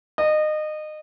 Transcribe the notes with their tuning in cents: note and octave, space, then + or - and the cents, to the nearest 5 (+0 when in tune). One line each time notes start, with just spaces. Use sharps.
D#5 -25